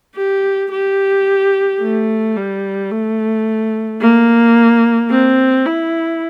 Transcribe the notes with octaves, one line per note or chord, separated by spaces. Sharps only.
G4
G4
A3
G3
A3
A#3
C4
E4